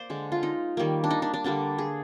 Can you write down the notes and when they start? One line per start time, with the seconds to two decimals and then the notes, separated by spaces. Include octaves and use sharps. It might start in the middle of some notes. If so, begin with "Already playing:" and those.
Already playing: A#3 C5 D5
0.10 D3 G#3
0.32 F4
0.43 D#4
0.77 D#3 G3 A#3
1.04 D4
1.11 D#4
1.22 D4
1.34 D4
1.44 D3 G3 A#3 D4
1.78 G#4